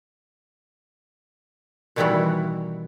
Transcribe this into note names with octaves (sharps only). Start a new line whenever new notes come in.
B2 D#3 E3 G3 E4 F#4